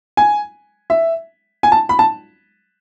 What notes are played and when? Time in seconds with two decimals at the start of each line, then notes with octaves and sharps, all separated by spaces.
0.17 G#5
0.90 E5
1.63 G#5
1.72 A5
1.89 B5
1.99 A5